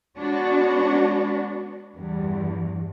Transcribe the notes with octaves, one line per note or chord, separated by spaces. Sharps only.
G#3 B3 D4 F#4 C#5
E2 G2